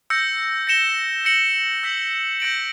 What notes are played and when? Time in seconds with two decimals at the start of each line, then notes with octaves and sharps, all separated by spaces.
0.10 E6 G6 A#6 C#7
0.67 A#6 C#7 E7 G7
1.25 A#6 C#7 F#7
1.83 E6 G6 B6 F#7
2.40 G6 A#6 D7 F#7